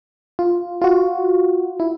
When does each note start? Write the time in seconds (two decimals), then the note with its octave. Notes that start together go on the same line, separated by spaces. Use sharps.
0.39 F4
0.82 F4 F#4
1.80 E4